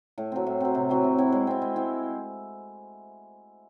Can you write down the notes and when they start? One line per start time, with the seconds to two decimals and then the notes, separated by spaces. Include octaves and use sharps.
0.18 A2
0.32 F#3 C4
0.47 A2
0.61 F#3 C4
0.75 C3
0.89 F#3 C4 E4
1.04 C3
1.18 F#3 C4 E4
1.32 G#3
1.47 C4 E4
1.62 G#3
1.76 C4 E4